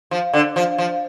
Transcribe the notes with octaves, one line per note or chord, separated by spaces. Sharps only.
F3
D3
F3
F3